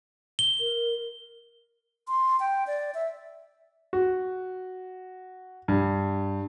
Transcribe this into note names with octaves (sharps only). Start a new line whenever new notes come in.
G7
A#4
C6
G5
D5
E5
F#4
G2